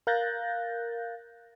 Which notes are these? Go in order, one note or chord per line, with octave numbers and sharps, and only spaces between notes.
A#4 F5 F#6 G6 A6 A#6